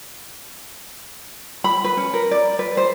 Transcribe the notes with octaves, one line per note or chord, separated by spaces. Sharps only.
B5
B4
C#4
A#4
D5
B4
C5